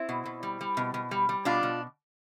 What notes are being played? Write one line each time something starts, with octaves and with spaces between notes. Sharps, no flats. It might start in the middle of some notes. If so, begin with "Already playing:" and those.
Already playing: C4 E4
B2
B2
G3
G3
B2
B2
G3
G3
B2 D4 F4
B2